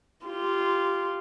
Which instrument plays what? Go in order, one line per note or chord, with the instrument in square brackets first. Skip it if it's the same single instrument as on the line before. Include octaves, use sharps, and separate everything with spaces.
[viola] F4 G4